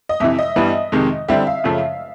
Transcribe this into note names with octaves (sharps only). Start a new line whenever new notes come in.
D#5
F2 C3 E3 E5
D#5
G2 E3 G3 B3
F2 C3 D#3 G#3
D3 G3 C4 E4 G4 E5
F5
F#2 C#3 F3 A3